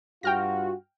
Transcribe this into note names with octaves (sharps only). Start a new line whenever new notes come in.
G2 F4 F#4 G5 F6 A#6